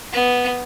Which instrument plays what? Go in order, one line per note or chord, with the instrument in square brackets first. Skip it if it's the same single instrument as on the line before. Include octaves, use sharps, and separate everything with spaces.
[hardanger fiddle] B3